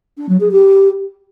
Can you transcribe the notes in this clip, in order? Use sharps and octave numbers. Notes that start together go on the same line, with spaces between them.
D4
F#3
G#4
G4